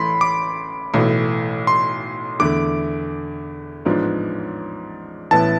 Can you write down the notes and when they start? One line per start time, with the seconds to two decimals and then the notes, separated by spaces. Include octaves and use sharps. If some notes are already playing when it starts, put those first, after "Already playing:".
Already playing: A1 A2 E3 A3 B5 C6
0.21 D6
0.94 B1 A2 E3 A3
1.67 C6
2.39 E2 D3 A3 E4 D6
3.85 A1 G#2 F3 B3 D4
5.31 A1 A2 E3 B3 E4 A5